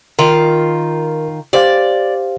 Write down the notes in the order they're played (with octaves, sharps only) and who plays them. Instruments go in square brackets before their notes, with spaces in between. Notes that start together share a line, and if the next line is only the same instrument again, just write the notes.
[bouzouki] D#3 F4 [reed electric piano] A#4
[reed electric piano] G4 C5 F5 [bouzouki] D5